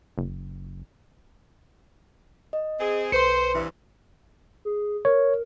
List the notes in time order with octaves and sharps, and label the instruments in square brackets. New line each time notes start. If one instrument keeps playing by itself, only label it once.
[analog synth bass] F#1
[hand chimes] D#5
[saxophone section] C4 G#4
[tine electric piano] B1 C#7 [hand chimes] B4 C6 [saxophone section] C5
[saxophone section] G2 C3 E3
[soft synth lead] G#4
[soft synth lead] A#4 [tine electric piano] C#5